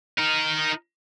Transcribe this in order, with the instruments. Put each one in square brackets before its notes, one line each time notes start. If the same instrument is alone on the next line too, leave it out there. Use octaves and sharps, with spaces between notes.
[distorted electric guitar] D#4 A#4